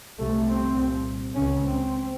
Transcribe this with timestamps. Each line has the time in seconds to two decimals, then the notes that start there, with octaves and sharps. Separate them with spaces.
0.18 C2 C3 A3
0.47 C4
0.76 C2 A#2
1.34 C#3 C#4
1.38 C#2
1.63 C4